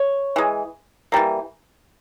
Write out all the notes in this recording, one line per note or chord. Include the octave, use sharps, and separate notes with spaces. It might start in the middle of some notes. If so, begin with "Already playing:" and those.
Already playing: C#5
E3 G#3
E3 G3 A#3